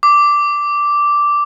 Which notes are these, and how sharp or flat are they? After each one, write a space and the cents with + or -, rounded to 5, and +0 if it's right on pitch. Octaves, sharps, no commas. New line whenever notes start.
D6 -5